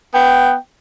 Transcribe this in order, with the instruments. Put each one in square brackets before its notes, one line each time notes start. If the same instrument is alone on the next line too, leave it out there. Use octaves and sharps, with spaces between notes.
[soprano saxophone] B3 [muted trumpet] G5